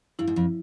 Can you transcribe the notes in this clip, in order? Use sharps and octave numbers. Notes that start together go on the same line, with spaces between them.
G2 E4
G#2
F2 F3